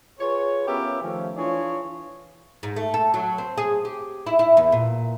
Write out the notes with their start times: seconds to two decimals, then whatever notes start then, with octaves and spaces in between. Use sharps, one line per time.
0.20 F4 G#4 B4 C#5
0.67 B3 C#4 F4 G4 A#4 E5
1.01 D#3 F3 A3 C#4
1.37 E3 D4 F4 G#4 C#5
2.63 G#2
2.76 A3
2.94 A4
3.14 F#3
3.38 C4
3.58 G#4
3.85 G4
4.27 E4
4.39 E4
4.57 E2
4.72 A#2